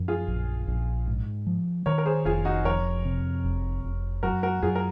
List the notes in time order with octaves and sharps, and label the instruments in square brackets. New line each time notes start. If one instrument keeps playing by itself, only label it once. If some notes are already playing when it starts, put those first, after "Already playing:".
Already playing: [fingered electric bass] F#2 F3
[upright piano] F4 G#4
[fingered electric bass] A#1
A#1
G#2
F3
[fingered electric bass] D#3 [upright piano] A#4 C#5
[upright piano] A#4
G#4 C5
[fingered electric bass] F1 [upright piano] F4 G#4
[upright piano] D#4 F#4
[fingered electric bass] F2 [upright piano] A#4 C#5
[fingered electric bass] C3
F1
F1
[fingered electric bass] F#2 [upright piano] F#4 A#4
[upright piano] F#4 A#4
[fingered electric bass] F#2 [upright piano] F4 G#4
[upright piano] A#4